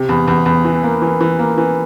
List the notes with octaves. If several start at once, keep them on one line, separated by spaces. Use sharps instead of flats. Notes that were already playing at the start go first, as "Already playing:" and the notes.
Already playing: C3
E2
E2
E2
E3
A#3
E3
E3
A#3
E3